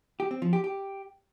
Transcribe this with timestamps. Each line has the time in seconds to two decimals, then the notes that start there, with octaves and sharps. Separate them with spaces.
0.20 G4
0.31 C4
0.42 F3
0.53 G4
0.64 G4